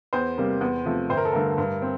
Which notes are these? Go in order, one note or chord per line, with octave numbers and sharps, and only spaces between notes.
E2 C5
C3 G3 A#3
E2
C3 F3 A3
G1 C5
A#4
A4
G2 D3 A3 A#4
G2
C4